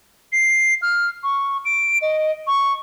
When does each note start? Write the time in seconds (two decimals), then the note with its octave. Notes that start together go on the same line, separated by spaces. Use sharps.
0.32 C7
0.82 F6
1.23 C#6
1.65 D7
2.02 D#5
2.47 C#6